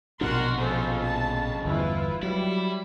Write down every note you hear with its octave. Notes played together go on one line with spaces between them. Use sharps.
A#1 F2 B2 D4 F#4 A#4 F#5 C6
F2 C#3 F3 A4 C5
A5
G1 E2 E4 F4 B4
F#3 G3 E4